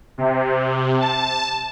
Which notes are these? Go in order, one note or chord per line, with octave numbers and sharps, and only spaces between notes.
C3
A5